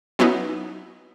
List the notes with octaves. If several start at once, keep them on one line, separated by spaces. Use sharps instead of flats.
F#3 B3 C#4 D#4 E4